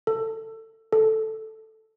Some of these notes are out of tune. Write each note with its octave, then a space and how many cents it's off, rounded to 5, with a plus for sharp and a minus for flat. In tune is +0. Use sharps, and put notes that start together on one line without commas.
A4 +20
A4 +0